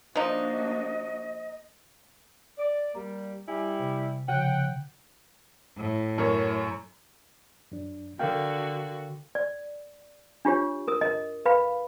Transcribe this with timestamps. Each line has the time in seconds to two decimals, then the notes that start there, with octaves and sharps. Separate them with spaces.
0.16 F3 A#3 D4 D#4 F#4 D#5
2.58 D5
2.95 G3 A#3 A#5
3.47 G3 E4 G4 G#5
3.79 C3
4.28 C#3 F3 F#5 G5
5.77 A2
6.18 F#2 A#4 C#5
7.72 F#2 D4
8.19 D3 F#4 A#4 F5 G5
9.35 D5
10.45 D4 F4 G4 C#5
10.88 A#4 D#6
11.01 A#4 D#5
11.46 B4 F5 B5